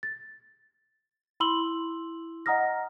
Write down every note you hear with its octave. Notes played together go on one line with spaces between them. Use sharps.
A6
E4 B5 C6 E6 F#7 G7
D#5 F#5 A#5 D#6 F6 A#6